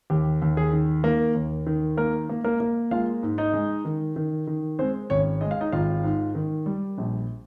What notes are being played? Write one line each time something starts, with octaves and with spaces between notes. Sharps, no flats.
D#2 G4
D#2
G#4
D#3
D#3 A#3 A#4
D#2
D#3
A#3 A#4
A#3
A#3 A#4
A#3
G#3 F4 F5
G#2
D#4 D#5
G#3
D#3
D#3
D#3
G#3 C4 C5
G#1 C#4 C#5
G#3 D#5
F5
D#4 D#5
G#1 F4 F5
G#2
D#3
G3
A#1